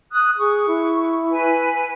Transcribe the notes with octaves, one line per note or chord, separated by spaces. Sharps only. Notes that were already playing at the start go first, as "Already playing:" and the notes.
D#6 F#6
G#4 C#6
E4
B4 G#5